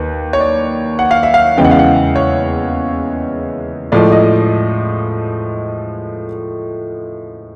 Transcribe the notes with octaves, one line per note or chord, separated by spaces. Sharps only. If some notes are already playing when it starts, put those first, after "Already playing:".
Already playing: D#2 B4
C#5
D5
F#5
F5
E5
F5
E2 C#3 E3 G#3 G5
F#5
F5
F#5
C#5
A2 F3 G#3 D5
D#5